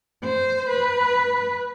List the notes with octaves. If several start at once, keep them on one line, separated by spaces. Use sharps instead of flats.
C5
B4